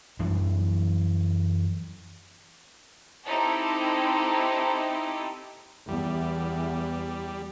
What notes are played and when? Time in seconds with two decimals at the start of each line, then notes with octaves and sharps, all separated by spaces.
0.19 F#2 E3 G3 D4
3.25 C4 D#4 E4 G4 A4
5.89 E2 G3